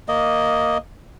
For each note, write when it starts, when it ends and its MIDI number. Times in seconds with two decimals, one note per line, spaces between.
0.08 0.78 58
0.08 0.78 75